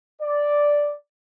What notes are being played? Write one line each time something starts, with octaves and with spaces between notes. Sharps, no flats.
D5